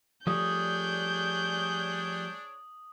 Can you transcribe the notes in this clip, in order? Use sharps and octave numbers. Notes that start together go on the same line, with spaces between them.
F3 G3 A3 D4 G#4 C#5 D#6 G6